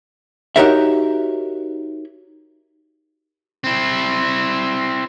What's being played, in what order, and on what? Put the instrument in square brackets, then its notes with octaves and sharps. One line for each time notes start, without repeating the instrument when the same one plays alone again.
[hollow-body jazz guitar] D#4 F#4 G4 A#4 C#5 E5
[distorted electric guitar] C4 E4